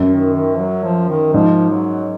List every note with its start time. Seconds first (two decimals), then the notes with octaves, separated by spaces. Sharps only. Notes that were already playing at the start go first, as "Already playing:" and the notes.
Already playing: F#2
0.10 D#3
0.34 D#3
0.59 F#3
0.83 F3
1.09 D#3
1.33 G#2 F3
1.70 F#3